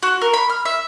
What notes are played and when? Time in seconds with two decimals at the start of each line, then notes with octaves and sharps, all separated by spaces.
0.03 F#4
0.21 A#4
0.34 B5
0.49 F6
0.65 E5